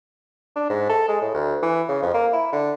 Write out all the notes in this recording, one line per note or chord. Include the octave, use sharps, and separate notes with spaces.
D4
G#2
A4
G#3
A2
D2
E3
C#3
F2
A#3
E4
D3